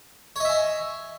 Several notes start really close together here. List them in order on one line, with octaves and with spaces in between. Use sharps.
C#5 D#5 E5 G#5